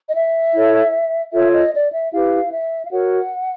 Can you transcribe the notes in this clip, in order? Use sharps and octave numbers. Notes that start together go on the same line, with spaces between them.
D#5
E5
E4 A4 C#5
F4 A4 C#5 E5
D#5
D5
E5
E4 G4 B4 F5
E5
F5
F#4 A#4 C#5 F#5